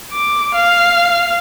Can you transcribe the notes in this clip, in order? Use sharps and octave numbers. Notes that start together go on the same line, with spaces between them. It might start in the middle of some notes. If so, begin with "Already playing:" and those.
D6
F5